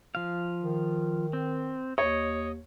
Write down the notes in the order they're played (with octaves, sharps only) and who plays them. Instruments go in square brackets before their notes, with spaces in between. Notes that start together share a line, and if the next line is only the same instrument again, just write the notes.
[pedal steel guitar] F3 F5
[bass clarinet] D#3
[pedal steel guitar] C4
[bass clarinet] D#2 [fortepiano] C#5 [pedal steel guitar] D#5